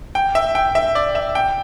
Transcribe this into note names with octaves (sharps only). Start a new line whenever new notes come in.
G5
E5
G5
E5
D5
E5
G5